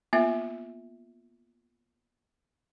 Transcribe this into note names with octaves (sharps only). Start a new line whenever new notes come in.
A#3 B3 F4 E5